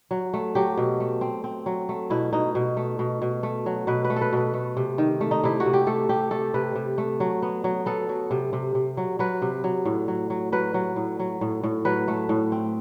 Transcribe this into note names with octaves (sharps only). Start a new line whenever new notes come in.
F#3
A3
F#3 G4
B2
A3
C4
C4
F#3
A3
B2 E4
B2 D#4
B2
A3
B2
B2
A3
F#3
B2 B4
B4
A3
A4
B4
B2 B4
A3
C3
D#3
A3
D#4
C3 E4
F#4
C3
G4
A3 A4
C3 G4
A3 A4
C3 B4
C3
A3
F#3
B3
F#3
B3 A4
F#3
C3
C3
C3
F#3
F#3 B4
C3
F#3
A2
F#3
F#3
F#3 B4
F#3
A2
F#3
A2
A2
F#3 B4
A3
A2
C4